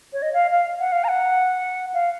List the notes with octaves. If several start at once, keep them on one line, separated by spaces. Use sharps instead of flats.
C#5
D#5
F5
F5
F#5
F5
A#5
F#5
F5